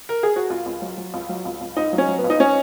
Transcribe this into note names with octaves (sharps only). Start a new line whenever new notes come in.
A#4
G#4
F#4
C#2 F4
C#2
F#3
F#3
C#2
F#3
C#2
C#2
C#2 D#4
F#3
C#4
F#3
B3
C#2
D#4
C#4